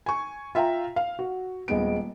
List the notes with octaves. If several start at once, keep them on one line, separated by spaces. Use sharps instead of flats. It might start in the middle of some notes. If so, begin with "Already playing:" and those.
G#5 C#6
F4 E5 F5 G5 A#5
F5
F#4
D#1 G#3 B3 D7